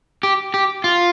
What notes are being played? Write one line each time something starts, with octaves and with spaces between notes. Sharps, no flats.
G4
G4
F4